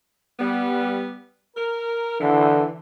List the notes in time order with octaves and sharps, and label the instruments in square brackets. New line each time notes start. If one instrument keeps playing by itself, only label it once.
[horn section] G3 B3
A#4
[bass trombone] D3 [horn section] E3